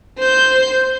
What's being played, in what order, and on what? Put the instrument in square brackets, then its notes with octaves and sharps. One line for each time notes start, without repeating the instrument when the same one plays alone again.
[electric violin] C5 G6